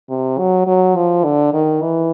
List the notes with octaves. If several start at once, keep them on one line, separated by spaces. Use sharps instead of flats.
C3
F#3
F#3
F3
D3
D#3
E3